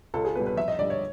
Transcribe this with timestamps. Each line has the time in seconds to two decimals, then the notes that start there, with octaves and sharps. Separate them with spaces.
0.14 C#2 A4
0.25 G#4
0.35 B2 G3 B4
0.47 B4
0.57 F2 E5
0.68 D#5
0.79 D3 G3 D5
0.90 C#5